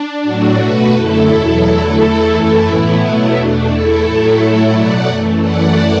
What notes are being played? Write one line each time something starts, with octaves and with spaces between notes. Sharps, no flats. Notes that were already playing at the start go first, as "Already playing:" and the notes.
Already playing: D4
A2 F#3 A3 D4 F#4
B2 A3 F#4 B4
F#2 D3 A3 E4 A4
E2 B2 F#3
E2 D3 F#3 A3 E4 A4
E2 E3 A3
F#2 E3 A3
A2 E3 A3 B3 E4
B2 F#3 A3
E2 B2 A3 D4
E2 E3 A3 E4 A4
A2 F#3 A3
A2 F#3 A3
B2 F#3 A3 D5 F#5
F#2 E3 A3
F#2 E3 A3 D5 F#5